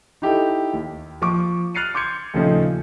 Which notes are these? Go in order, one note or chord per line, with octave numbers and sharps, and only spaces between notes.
D#4 E4 G4 A4
D#2
F3 C#6 D6
F6 F#6 A6 C7 C#7 D#7
C6 D6 G6 G#6 C#7
D#2 A#2 C#3 F3 A3 D#4